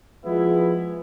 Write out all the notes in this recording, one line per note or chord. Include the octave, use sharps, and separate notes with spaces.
F3 G#3 B3 E4